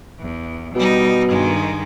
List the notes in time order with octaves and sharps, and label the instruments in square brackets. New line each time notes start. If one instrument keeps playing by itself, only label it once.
[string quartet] E2
[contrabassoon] B2 [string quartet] G3 D#4
[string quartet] G2 D#3 G#3